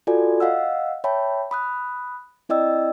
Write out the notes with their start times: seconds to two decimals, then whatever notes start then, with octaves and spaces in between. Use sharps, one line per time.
0.07 F4 F#4 A4 D5 G#5
0.40 D#5 F5 F#5 E6
1.04 C#5 E5 G5 A5 B5
1.51 B5 D#6 F#6
2.49 C4 E4 D5 D#5 G5 E6